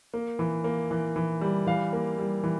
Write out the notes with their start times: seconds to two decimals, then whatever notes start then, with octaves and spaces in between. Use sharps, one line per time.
0.14 A#3
0.39 E3
0.64 A#3
0.91 E3
1.16 E3
1.41 G3
1.66 E3 F5
1.93 A#3
2.18 G3
2.44 E3